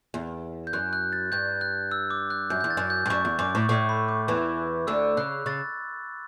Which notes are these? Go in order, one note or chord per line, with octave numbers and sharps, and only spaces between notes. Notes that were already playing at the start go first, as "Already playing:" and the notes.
E2
G6
F#2 F#6
F#6
A6
G2 G6
F#6
E6
D6
F#6
F#2 G6
E2 G6
A6
F#2
G6
G2
F#2 C#6
E2
F#2 D6
A2
A2 C#6
B5
D6
E2 E3
D2 D3 E6
C#3 F#6
C#3 A6